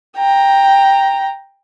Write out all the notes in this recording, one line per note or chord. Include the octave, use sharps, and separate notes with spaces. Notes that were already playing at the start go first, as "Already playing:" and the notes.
G5 A#5